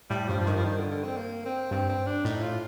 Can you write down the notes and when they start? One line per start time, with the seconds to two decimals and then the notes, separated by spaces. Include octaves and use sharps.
0.10 A2 G3
0.28 G2 F3
0.40 F3
0.46 G2 D#3
0.57 F3
0.64 D#3
0.78 D3
0.91 D3
1.04 C4
1.17 A#3
1.45 C4
1.71 G2 C4
1.89 C4
2.07 D4
2.25 A2 D#4
2.42 F4